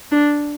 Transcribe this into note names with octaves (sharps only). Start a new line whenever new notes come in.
D4